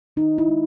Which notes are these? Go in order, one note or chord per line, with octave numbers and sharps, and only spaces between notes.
D#3 D#4
E4
G#3